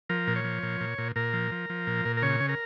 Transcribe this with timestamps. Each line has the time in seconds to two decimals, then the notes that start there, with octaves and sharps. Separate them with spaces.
0.09 F3 A#4
0.27 A#2
0.36 C#5
0.44 F3
0.63 A#2
0.81 A#2
0.98 A#2
1.16 A#2 A#4
1.33 F3
1.52 F3
1.70 F3
1.87 A#2
2.05 A#2
2.17 A#4
2.22 C#3 C#5
2.40 C#3
2.49 A#4